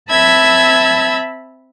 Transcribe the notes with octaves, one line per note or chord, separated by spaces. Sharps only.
C4 E5 A5 B5 E6 G#6